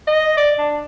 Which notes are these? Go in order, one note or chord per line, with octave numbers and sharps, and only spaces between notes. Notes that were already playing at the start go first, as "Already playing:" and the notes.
D#5
D5
D4